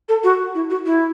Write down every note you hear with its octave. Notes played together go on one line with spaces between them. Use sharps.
A4
F#4
E4
F#4
E4